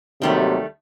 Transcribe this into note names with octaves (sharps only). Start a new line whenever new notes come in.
D#2 C3 D#3 F#3 G3 A3